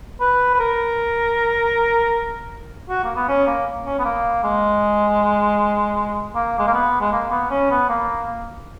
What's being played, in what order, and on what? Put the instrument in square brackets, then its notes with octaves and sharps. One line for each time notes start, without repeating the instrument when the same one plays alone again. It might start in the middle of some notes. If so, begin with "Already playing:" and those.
[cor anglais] B4
B4
A#4
F#4
A#3
B3
C#4
A#3
C#4
B3
A#3
G#3
A#3
G#3
A#3
B3
G#3
A#3
B3
C#4
B3
A#3